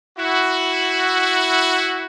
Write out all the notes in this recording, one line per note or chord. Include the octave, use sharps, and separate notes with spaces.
E4 F#4